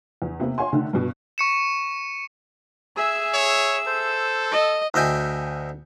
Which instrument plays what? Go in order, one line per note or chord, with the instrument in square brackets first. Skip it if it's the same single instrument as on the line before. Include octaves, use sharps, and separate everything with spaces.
[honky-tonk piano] E2
C3 A#3 B3
C#5 F5 F#5 G#5 C6
D3 D#3 A3
G2 B2
[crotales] C#6 C#7 E7
[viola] G#4 E5 [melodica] G#5 [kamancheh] E6
[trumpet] C#5
[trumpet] A4 [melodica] C5
[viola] D#5
[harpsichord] D2 D#5 E5 G5 G#5